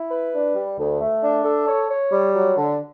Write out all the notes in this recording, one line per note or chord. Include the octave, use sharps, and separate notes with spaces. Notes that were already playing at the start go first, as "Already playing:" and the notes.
Already playing: E4
B4
D4
G3
D2
A3
D4
A4
C#5
C#5
G3
F#3
D3